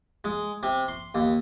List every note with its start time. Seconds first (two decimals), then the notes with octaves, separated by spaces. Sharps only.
0.24 G#3
0.63 C3
0.88 C6
1.15 D#2